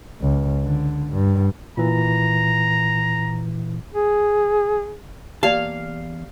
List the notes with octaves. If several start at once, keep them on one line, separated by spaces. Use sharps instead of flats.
C#2
D3
G2
A#2 E3 A#5
G#4
E2 A#3 G4 D5 F5 A5